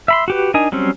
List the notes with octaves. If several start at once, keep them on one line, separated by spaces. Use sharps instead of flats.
E5 B5 C6
F#4 G4 B4
D4 D#4 A#4 D#5 G#5
F#3 G3 C4 C#4 C5